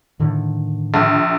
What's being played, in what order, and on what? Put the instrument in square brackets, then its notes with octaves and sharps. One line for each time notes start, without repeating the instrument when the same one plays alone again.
[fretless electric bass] A2 D3 D#3
[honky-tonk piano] A#1